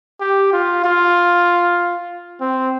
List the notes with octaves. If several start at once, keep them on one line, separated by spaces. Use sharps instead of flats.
G4
F4
F4
C4